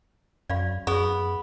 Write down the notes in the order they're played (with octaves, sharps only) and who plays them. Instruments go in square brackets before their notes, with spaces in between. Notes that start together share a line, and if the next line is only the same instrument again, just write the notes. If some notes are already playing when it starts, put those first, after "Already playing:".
[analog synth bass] F#2 [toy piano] D5 F5 B5
[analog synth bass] F#2 [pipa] B3 [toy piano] G#4